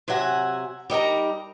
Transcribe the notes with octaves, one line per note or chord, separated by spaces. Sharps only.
C3 F#3 E5 F#5 G#5
G3 D#4 A#4 A#5